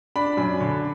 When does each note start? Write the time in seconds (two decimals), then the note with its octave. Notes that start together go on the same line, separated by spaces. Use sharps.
0.16 D4 B5
0.37 F#2 B5
0.60 D3